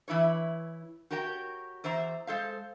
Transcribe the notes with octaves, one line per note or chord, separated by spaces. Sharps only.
E3 E4 B4 C#5
F#4 G4 A#4 C#5 G5
E2 C5 E5 A#5
G#3 A4 C5 F5